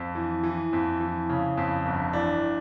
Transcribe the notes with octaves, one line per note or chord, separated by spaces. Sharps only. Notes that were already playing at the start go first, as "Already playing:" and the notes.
Already playing: F2
E3
E3
F2
E3
C#3
F2
G1
E3 D4